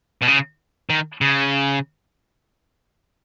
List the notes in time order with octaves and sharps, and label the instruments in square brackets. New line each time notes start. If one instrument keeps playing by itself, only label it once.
[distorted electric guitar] B2
C#3
D#3
C#3